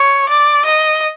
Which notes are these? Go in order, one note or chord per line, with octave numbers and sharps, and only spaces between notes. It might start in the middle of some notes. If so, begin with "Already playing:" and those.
Already playing: C#5
D5
D#5